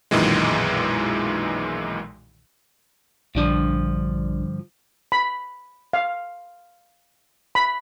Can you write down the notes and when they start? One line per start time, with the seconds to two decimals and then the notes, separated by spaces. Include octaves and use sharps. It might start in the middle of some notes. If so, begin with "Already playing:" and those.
0.11 B1 F#2 A#2 D#3 E3 G#3
3.35 A#1 G2 D3 F3 D4
5.12 B5
5.93 F5
7.55 B5